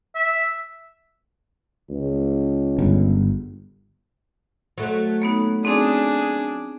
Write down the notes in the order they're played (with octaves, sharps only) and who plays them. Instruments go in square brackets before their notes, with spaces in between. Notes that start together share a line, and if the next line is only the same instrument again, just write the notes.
[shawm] E5
[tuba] C#2
[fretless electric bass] G1
[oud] F#3 A3
[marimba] A#3 B3 D#4
[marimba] C4 D#4 [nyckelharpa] D4 G#4